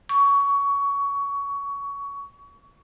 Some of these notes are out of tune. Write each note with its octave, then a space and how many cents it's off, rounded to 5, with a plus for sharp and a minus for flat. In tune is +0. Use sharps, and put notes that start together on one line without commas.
C#6 +20